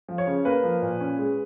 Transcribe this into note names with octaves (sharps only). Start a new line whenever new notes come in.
F3
C#5
C#3
A#3 B4
F3
A#2
C#4
G#3